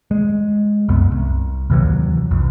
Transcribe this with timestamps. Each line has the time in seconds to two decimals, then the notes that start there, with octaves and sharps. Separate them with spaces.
0.11 G#3
0.89 C2 F#2 B3
1.11 C2
1.70 D#2 C3 E3 F#3
2.31 B1 F2